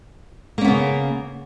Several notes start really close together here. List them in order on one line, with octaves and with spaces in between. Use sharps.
A#3 C#4 B3 C#3